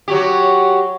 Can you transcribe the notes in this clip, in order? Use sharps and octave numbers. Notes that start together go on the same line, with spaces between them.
F#3 F#4 G4